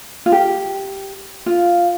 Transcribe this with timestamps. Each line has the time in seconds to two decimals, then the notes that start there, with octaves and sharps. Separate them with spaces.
0.26 F4
0.32 G4
1.46 F4